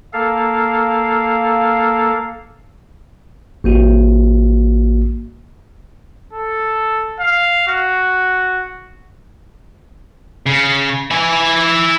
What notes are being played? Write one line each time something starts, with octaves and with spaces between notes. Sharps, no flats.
A#3 A4 F5
A1 A#3 F#4
A4
F5
F#4
C#3
E4 G#5